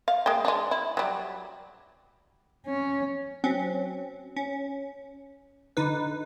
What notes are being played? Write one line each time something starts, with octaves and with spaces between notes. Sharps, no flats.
F5
G#3 A#3 G5
G#3 D4
E4
F#3 G3
C#4
F#3 C4 C#4
C#4
D3 D#4 B4